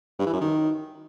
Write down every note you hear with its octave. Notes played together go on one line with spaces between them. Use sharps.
G2
E3
F#2
D#3